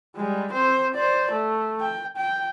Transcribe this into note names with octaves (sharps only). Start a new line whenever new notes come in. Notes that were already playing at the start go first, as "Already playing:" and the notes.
G3 G#3
C4 C5
C5 D5
A3
G5
G5